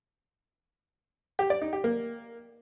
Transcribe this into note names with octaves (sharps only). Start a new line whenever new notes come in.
G4
D5
D#4
G4
A#3